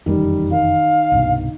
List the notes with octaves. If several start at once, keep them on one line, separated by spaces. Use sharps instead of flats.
F1 F#2 D#3 E3 G3
D#3 F5
C2 G2 B2